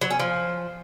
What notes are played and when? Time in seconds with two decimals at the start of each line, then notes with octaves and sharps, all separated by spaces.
0.01 F#3
0.10 C#4
0.20 F3